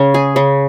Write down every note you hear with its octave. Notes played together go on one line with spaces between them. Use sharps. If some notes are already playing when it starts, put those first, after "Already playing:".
Already playing: C#3 C#4
G#4
C#3